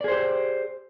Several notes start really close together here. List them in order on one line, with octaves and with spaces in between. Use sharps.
D5 G#4 C5 G4